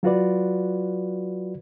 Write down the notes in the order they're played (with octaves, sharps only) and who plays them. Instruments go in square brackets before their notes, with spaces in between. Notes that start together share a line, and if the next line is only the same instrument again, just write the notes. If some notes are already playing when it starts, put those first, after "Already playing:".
[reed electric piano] F#3 F4 F#4 B4 D5